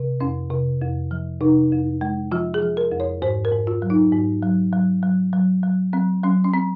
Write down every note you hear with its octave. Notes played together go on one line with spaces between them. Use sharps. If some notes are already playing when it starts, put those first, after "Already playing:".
Already playing: C3
F2 C#4
C3
F2
F3
C3 D#4
F2
G#3
F3 F4
G#4
F3
A#4
F2
C#5
G#2 C5
A#4
G#2
F4
F#3
D#4
G#2
F#3
F#3
F#3
F#3
F#3
F#3 C4
F#3 C#4
C#4
C4